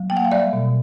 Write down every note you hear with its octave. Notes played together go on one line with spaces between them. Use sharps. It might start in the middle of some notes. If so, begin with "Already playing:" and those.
Already playing: F#3
A#3 G5
F#5
F5
G3 D5 E5
B2